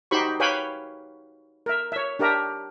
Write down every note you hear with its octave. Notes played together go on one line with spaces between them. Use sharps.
D#4 F#4 G4 C5 B5 C#6
B4 C#5 F5 G5 G#5 B5
A#4 E5
C#5 E5
D4 G4 A#4 E5 A#5